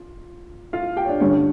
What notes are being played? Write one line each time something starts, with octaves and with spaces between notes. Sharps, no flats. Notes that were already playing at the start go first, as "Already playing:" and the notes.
Already playing: F4
F4 F5
G4 G5
C#5
D4 D5
G2 D3 G3 C#4 D4 C#5